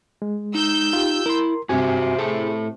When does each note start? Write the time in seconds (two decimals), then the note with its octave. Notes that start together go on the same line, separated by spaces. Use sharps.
0.22 G#3
0.55 D#4 E6 G6
0.93 F4 G4
1.26 E4 A#4 C6
1.69 G2 C3 C4 F#4 G4 E5 G#5
2.19 A2 G#4 A4 E5